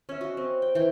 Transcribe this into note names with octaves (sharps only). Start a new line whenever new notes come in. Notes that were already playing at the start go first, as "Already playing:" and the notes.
C#4 E5
F#4 D#5
C4
G5
E3 G5